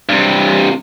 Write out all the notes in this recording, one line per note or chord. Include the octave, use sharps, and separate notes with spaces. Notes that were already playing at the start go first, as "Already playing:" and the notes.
G2 C3